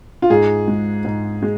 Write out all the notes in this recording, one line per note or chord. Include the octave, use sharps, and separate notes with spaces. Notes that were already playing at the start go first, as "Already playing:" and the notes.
F4
G#2 G#4
G#3
G#2
G#3